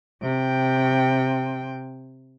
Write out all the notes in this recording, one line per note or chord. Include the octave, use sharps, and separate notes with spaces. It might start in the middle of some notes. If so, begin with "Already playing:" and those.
C3 G5